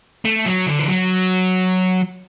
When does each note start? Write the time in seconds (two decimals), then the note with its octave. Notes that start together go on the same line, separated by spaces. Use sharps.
0.25 A3
0.46 F#3
0.67 D3
0.79 E3
0.88 F#3